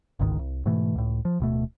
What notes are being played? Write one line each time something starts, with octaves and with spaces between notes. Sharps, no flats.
G1 C#2 G#2 D#3
C2
G#2 B2 E3 A3
C#2 A2
F3
D1 B2 A3